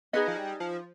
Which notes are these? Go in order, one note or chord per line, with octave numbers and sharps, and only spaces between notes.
B3 D#4 G#4 B4 D#5
F3
G3
F3